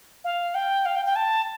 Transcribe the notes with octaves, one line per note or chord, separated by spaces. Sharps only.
F5
G5
F5
G5
G5
A5